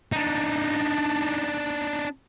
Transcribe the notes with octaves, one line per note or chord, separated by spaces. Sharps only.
D4 D#4